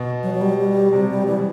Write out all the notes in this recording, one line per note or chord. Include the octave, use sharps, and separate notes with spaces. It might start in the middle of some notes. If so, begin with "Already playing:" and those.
Already playing: B2
F#3
F#3
G3
G3
C3 G3
G3
E3 G3